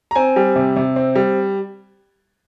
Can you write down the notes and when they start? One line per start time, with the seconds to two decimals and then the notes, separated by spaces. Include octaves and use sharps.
0.11 A#5
0.15 C4 G#5
0.36 G3
0.56 C3
0.76 C3
0.96 C4
1.15 G3